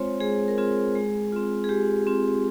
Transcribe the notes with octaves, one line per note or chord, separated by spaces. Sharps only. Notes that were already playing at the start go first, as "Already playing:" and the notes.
Already playing: G#3 C4 F4 C5 C#5
G#3 G#4
A#4
C4 F4 G#4
G#3
C4 F4
G#4
G#3 G4
C4 F4